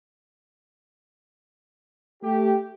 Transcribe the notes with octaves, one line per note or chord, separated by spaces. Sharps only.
A3 G4